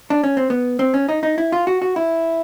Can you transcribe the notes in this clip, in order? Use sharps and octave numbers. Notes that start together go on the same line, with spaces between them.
D4
C#4
C4
B3
C4
C#4
D#4
D#4
E4
F4
F#4
F#4
E4